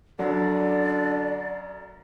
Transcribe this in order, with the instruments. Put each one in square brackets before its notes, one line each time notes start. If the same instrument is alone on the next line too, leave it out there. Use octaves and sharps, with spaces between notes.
[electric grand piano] F#2 F#3 [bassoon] D3 [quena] D5